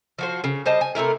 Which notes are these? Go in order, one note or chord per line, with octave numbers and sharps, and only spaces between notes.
F3 F#4 C5
C#3
G3 C5 D#5 A5
G#5
C3 A3 E4 A#4